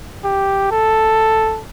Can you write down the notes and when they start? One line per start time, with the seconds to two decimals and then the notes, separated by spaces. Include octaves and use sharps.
0.24 G4
0.71 A4